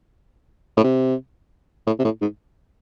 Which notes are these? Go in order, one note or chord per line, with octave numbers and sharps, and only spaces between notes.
A2
C3
A2
C3
A2
G#2